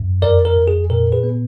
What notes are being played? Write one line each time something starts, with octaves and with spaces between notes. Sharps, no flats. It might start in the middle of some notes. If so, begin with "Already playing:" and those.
Already playing: F#2
F2 A#4 D5
A#4
F2
G#4
A#2 A#4
G#4 B4
B3